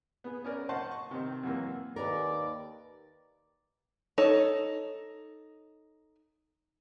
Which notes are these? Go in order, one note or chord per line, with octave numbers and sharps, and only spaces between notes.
B3 G#4
C#4 A#4 D5
C5 D#5 F#5 A5 C6 C#6
C#6
C3 D#3 C4
F#2 C3 E3 A#3
D#2 A#4 B4 D5
D#4 A4 C#5